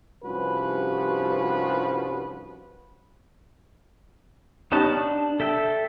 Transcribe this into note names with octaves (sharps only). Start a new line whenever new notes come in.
C2 G2 F3 C#4 F#4 B4
B3 C#4 D#4 G4 A5
D4
A4 E5 G5